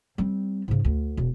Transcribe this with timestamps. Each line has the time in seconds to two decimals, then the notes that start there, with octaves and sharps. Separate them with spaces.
0.18 G3 C4
0.68 G#2 C#3
0.85 D2
1.17 E1